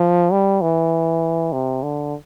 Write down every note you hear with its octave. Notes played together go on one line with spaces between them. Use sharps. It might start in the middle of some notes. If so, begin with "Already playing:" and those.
Already playing: F3
G3
E3
C3
D3